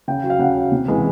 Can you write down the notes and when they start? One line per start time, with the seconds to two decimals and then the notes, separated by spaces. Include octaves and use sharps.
0.08 C#3 G5
0.24 F#3
0.30 F5
0.39 C#3 F#5
0.56 F#3
0.72 C3
0.88 E3 G#3